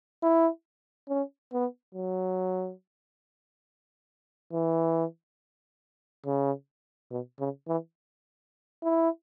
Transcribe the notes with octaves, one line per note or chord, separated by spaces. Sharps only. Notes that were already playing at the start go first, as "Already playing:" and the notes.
E4
C#4
B3
F#3
E3
C#3
B2
C#3
E3
E4